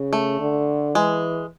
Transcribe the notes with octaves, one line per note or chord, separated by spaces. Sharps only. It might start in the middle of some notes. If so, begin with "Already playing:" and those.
Already playing: C#3
A3
D3
E3 G#3